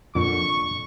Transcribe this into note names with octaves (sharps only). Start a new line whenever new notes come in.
F2 A#2 D3 C#6